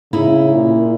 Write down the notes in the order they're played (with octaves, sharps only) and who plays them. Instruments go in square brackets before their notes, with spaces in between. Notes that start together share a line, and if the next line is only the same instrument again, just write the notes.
[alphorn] C#3 [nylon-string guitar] D#4 E4
[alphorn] A#2